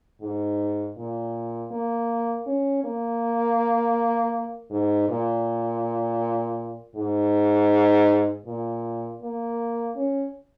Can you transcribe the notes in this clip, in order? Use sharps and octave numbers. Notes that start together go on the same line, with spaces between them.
G#2
A#2
A#3
C#4
A#3
G#2
A#2
G#2
A#2
A#3
C#4